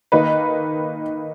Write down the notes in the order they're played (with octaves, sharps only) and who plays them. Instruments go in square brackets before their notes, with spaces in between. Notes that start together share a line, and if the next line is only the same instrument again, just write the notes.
[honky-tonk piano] D#3 A#3 D#4 B4